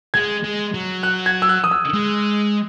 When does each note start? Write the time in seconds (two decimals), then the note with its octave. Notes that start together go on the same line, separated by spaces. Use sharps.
0.14 G#3 G#6
0.44 G#3
0.74 F#3
1.03 F#6
1.26 G#6
1.42 E6
1.49 F#6
1.64 D#6
1.71 E6
1.94 G#3